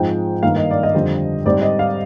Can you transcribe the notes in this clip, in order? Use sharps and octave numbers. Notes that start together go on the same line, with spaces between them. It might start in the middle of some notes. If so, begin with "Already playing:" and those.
Already playing: G#2 F3 G#3 C4 G5
G2 D#3 A#3 F5
D#5
D5
D#5
F2 D3 G3 C4
G#2 G3 C4 D5
D#5
F5